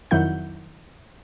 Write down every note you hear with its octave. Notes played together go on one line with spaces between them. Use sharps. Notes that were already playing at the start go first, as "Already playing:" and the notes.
F2 D#3 F#3 E4 F#5 G6